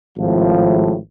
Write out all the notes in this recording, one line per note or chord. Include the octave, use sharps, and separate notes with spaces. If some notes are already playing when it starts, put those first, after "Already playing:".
G#1 A2 C3 F3